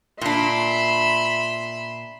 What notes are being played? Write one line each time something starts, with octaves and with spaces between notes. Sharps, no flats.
A#2 D4 E5 B5 C6